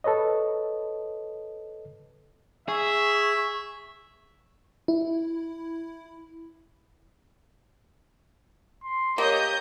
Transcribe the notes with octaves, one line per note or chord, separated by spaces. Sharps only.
A4 B4 C#5 D#5
G#4 E5 C#6
E4
C6
A#3 G4 C#5 D#5 G6